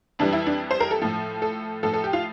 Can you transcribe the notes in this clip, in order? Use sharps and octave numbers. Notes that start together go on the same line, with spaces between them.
F2 E3 G3 D4
E4
D4
C5
A#4
A4
A2 F3
A4
A2 F3 A4
A4
G4
F4